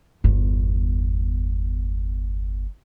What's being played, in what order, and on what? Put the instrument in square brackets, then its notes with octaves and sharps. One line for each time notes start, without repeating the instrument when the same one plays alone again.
[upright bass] G1 E2